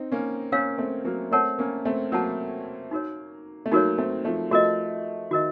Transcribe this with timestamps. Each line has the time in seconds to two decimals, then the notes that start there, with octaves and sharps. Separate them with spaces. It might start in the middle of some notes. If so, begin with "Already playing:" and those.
Already playing: C4 D#4
0.12 A#3 C#4
0.52 A#3 C#4 A#4 C#5 F5
0.78 A3 C4
1.05 F#3 A#3
1.31 A3 C4 A#4 C#5 F#5 A5
1.59 A#3 C#4
1.85 A3 C4
2.12 F#3 A#3 A#4 C#5 F#5 A5
2.91 D#4 F#4 A#4 C#5
3.66 A3
3.71 F#3 A#3 D#4 F#4 A#4 C#5
3.98 A3 C4
4.25 F3 A3
4.51 F3 A3 F#4 A#4 D#5
5.31 D#3 F#4 A#4 D#5